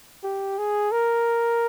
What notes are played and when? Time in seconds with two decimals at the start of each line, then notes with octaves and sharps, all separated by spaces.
0.24 G4
0.58 G#4
0.92 A#4